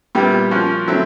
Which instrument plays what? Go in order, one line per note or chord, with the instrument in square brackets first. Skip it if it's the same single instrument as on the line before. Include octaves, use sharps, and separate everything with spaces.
[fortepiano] A#2 G3 B3 E4 G4
F3 A#3 C#4 F#4
D3 F#3 A3 C4 E4